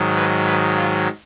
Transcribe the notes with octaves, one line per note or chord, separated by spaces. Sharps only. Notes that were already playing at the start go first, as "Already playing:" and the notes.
Already playing: G#2 D#3 F#3
B4
B4
F4